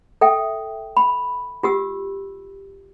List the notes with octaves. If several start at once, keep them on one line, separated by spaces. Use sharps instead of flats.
A4 E5 G5
B5
F4 G4 E6